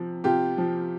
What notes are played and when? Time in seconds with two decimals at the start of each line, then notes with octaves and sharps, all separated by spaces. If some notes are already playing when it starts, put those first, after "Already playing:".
Already playing: C3 F3
0.24 C3 F4 G4
0.58 F3